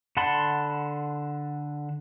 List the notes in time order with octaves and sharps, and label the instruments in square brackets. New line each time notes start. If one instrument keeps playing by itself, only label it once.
[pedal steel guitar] D3 F#5 A5 B5 C6